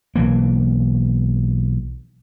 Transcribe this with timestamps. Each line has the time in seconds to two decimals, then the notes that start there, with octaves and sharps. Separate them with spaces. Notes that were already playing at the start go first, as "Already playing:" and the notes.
0.16 B1 E3 A#3